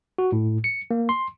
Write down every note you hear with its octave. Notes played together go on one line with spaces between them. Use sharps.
F#4
A2
C#7
A#3
C6